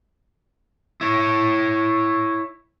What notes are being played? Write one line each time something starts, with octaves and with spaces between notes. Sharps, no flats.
E4 C#5